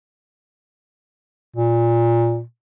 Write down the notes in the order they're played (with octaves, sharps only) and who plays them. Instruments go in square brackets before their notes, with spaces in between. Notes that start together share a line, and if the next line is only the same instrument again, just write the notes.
[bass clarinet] A#2